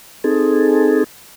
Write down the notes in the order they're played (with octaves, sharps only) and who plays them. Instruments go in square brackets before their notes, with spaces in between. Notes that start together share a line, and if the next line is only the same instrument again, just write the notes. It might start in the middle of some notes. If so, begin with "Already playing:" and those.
[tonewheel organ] C4 D#4 G#4 A4